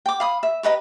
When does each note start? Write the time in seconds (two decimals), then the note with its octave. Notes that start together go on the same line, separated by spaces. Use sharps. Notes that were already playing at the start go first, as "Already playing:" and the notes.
0.06 G5 D6
0.20 F5 B5 D#6
0.43 E5
0.63 G4 B4 D#5 A#5